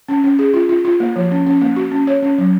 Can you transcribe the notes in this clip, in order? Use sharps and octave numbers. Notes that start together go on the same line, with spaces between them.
C#4
C#4
G#4
F4
F4
F4
A#3
F3
C#4
C#4
A#3
F#4
C#4
C#5
C#4
F#3